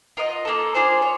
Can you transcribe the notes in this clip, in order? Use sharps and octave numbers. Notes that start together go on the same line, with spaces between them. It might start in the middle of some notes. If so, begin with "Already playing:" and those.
F4 A#4 D#5 F#5
A#3 D4 F4 A4
D4 F4 G#4 C5
C#5